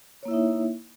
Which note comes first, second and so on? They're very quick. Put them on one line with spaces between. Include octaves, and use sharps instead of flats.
C#5 A#3 E4 E5 D#4